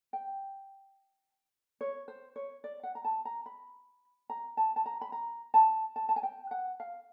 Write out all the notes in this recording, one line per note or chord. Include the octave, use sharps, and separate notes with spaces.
G5
C#5
C5
C#5
D5
F#5
A#5
A5
A#5
B5
A#5
A5
A5
A#5
B5
A#5
A5
A5
A5
G#5
G5
F#5
F5